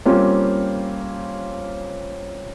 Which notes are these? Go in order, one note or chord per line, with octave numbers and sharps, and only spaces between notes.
G3 A#3 C4 C#4 F4 G4